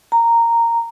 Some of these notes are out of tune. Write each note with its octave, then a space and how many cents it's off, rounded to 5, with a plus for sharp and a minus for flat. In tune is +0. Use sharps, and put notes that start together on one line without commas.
A#5 -10